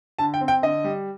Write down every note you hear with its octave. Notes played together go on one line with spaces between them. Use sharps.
D3 A5
G5
C4
G5
D3 D#5
G3